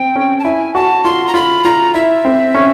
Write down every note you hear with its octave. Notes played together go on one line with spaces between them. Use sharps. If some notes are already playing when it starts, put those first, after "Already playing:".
Already playing: C4 G5
C#4
A5
E4 G#5
F#4 A5
F4 C6
A#5
F4 B5
F4 A#5
E4 E5
C4
C#4